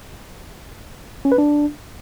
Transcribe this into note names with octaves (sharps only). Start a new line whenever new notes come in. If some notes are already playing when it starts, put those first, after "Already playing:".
C#4
B4
D4